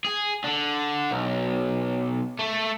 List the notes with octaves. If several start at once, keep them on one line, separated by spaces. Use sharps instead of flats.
G#4
D3
B1
A3